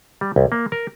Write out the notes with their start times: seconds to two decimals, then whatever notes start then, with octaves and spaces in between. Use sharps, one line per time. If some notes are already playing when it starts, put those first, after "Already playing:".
0.21 G3
0.36 C2
0.52 A#3
0.72 A#4